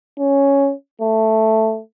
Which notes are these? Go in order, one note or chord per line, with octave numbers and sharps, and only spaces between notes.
C#4
A3